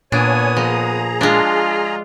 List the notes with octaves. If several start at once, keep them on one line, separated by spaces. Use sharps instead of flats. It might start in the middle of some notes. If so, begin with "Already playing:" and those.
A#2 B3 D4 C#5 G#5 D#6
F3 G#4 A#5
G#3 D4 F4